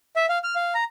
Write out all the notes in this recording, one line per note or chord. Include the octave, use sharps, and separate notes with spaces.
E5
F5
F6
F5
A#5